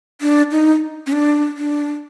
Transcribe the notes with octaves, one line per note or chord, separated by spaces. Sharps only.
D4
D#4
C#4
D4
D4